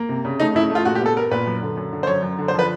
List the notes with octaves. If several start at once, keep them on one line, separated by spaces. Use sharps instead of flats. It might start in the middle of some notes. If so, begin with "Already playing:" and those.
Already playing: A#3
C3
C#3
A3 D#4
C#3 E4
A3
F4
A#2 F#4
G4
B3 A4
B3 A#4
A#2 B4
F#2
D3
F#2
D3
C5
F#2 C#5
F#2
D3
C5
F3 B4